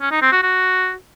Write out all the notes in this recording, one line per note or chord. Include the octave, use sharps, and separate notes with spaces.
C#4
D#4
C4
F#4
F#4